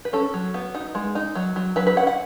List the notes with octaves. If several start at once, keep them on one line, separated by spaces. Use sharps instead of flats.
B4
C#4 A4
F#3
B3
D#4
G#3
D#4
F#3
F#3
F#3 B4
B4
C#4 F#5
F#5